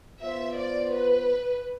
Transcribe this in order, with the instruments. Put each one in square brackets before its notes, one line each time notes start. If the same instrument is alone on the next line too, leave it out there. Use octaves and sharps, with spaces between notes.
[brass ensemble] B3 F4 C5 [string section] E5
[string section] D5
B4